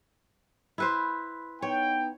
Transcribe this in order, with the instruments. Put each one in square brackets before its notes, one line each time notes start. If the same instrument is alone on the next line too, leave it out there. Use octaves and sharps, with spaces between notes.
[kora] E4 B4 C5
[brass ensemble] B3 D#4 G5 [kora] C#5